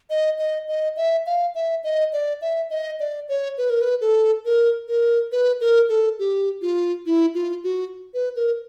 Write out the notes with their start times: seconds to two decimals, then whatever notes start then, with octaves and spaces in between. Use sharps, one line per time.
0.10 D#5
0.39 D#5
0.68 D#5
0.97 E5
1.26 F5
1.55 E5
1.84 D#5
2.13 D5
2.41 E5
2.70 D#5
3.00 D5
3.29 C#5
3.58 B4
3.70 A#4
3.81 B4
4.01 A4
4.45 A#4
4.88 A#4
5.32 B4
5.61 A#4
5.89 A4
6.19 G4
6.62 F4
7.06 E4
7.35 F4
7.64 F#4
8.14 B4
8.36 A#4